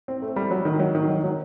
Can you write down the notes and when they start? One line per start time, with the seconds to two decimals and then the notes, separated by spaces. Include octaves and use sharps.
0.08 C4
0.22 A3
0.36 G3
0.51 F#3
0.65 D#3
0.80 F#3
0.95 D#3
1.09 F#3
1.19 D#3
1.24 F#3